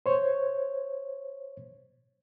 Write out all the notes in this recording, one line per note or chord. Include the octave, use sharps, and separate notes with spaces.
C5 C#5